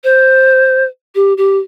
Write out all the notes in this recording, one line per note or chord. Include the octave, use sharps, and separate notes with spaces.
C5
G4
G4